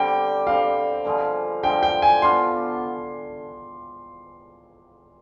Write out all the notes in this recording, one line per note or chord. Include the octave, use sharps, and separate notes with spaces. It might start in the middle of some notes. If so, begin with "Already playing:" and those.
Already playing: D3 G3 C4 G4 G5
D3 G3 C4 G4 F5
G2 D3 F3 G#3
G2 D3 F3 G#3 G5
G5
G#5
F3 B3 D4 F4 C6